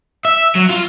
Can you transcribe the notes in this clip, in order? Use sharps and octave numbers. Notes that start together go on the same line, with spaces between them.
E5
F#3
F4